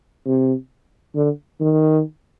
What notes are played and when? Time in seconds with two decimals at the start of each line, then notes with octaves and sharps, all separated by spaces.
0.26 C3
1.15 D3
1.60 D#3